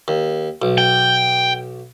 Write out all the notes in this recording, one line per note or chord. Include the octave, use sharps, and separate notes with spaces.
D#2
B1
G5